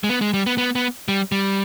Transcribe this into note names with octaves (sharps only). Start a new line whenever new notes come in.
G#3
B3
G#3
G3
B3
B3
B3
G3
G3